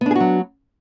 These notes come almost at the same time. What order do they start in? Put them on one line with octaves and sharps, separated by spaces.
B3 D4 G#4 F#4 F#3